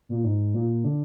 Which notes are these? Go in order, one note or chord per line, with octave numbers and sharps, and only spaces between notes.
A#2
G#2
A#2
D3